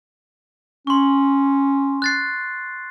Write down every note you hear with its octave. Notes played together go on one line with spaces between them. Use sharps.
C#4 C6 C#6
F#6 A6 C7